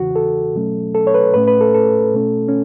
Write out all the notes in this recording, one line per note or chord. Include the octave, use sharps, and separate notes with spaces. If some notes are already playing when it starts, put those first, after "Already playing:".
Already playing: E2 C#3 E3 F#4
A4
B2 F#3 A3 C#4
A4
C#5
B4
A2 A3 C#4 B4
B4
A4
A4
B2 A3 C#4
C#4